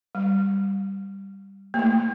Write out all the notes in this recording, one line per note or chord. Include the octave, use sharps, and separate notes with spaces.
G3
A#3
A3